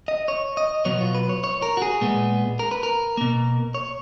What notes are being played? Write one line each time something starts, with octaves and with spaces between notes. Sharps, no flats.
D#5
C#5
D#5
B2 F#3 B3 C#5
F4
B4
C#5
C#5
A#4
F#4
G#4
A#2 G#3 B3
A#4
B4
A#4
B2 A#3
C#5